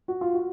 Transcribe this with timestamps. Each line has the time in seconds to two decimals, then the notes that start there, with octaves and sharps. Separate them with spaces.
0.08 F#4
0.21 F4
0.34 F#4